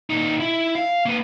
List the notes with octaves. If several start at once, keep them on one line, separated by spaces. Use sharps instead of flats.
A#2 D#4
E4
F5
A#3 B4